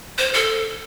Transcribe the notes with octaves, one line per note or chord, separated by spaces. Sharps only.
C5
A4